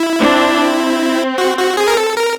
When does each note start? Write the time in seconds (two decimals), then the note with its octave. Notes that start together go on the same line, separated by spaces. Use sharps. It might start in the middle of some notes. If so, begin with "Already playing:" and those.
Already playing: E4
0.20 C4 D4
0.60 C4
1.38 F#4
1.58 F#4
1.77 G#4
1.88 A#4
1.97 A4
2.17 A#4